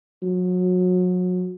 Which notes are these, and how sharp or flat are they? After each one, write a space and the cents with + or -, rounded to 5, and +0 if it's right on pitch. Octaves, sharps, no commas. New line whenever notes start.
F#3 -30